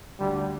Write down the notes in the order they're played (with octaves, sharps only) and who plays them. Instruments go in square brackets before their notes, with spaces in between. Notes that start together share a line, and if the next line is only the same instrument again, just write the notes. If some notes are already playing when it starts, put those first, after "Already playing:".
[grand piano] D2 D3 [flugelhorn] G3